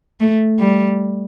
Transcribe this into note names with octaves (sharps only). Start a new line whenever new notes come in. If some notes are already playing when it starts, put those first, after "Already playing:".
A3
G3